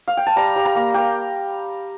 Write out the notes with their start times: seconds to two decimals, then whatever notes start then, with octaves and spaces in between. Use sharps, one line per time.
0.08 F5
0.17 G5
0.26 A5
0.36 G3 A#5
0.56 G3
0.65 A#5
0.75 A#3
0.94 A#3 G5